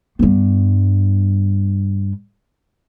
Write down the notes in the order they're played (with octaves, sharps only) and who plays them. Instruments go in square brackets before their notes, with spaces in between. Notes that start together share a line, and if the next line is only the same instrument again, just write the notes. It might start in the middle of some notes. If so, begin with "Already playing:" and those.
[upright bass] G2 B3